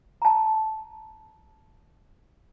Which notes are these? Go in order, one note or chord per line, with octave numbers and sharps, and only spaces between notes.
A5 A#5